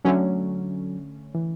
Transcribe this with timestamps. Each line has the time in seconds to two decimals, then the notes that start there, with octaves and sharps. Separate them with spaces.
0.04 D3 F#3 A3 C#4
1.35 E3